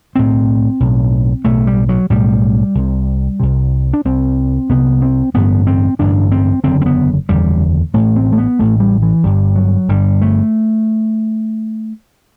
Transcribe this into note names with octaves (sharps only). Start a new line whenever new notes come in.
B1 A2 C4
B1 A2
B1 A2 A3
G3
F#3
B1 A2 G3
C2 C3
C2 C3
D4
C2 C3 C4
C2 C3 B3
C4
A1 G2 D3 B3
C4
A1 G2 D3 D4
C4
F#1 E2 D3 C4
C4
B3
F#1 E2 D3 G3
A1 A2 A3
C4
A3
B3
A1 A2 A3
G3
E3
G1 G2 D3 G3
F#3
G1 G2 D3 G3
A3